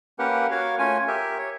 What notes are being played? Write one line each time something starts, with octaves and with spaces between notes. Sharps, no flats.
A#3 C#4 G4 A#4 B4 F#5
F#4 A#4 C#5 F5
A3 C#4 F4 C#5 G#5
G4 A#4 E5
C#5